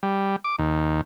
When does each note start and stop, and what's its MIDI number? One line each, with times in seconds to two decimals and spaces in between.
0.03 0.36 55
0.44 0.56 86
0.59 1.01 39